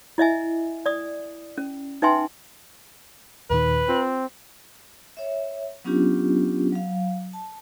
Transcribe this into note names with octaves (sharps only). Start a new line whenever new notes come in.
E4 D#5 E5 G#5
D5 D#6
C#4
D#4 B4 E5 G5 G#5 C6
D#2 A#2 D#3 B4
C4 F4
C#5 E5
F#3 B3 C#4 D4 F4 G4
F#3 F5
A5